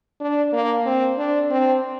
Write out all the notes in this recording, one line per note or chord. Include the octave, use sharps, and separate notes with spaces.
D4
A#3
C4
D4
C4